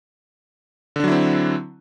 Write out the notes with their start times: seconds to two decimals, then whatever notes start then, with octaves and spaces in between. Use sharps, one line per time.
0.96 D3
1.00 D4
1.04 F#3
1.08 E4
1.12 C4